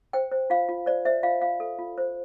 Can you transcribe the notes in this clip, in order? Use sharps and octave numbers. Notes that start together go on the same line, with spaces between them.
C5 G5
C5
F4 F5
F4
C5 D5
C5 E5
F4 F5
F4 F5
A4
F4
C5